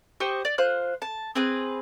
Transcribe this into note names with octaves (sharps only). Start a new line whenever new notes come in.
G4 C5 D#5 C#6
D5
F4 C5 F#6
A5
C4 G#4 B4